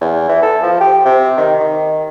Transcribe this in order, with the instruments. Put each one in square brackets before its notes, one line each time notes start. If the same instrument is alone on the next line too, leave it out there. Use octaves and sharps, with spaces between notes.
[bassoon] E2
E3
A4
F3
G4
C3
D#3
D#3